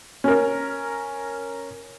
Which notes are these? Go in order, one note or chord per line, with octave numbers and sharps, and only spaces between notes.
C#4 A#4